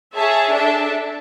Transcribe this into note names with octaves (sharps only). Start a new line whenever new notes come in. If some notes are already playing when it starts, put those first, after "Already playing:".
G#4 C#5 E5 A5
D4 A4 E5 A5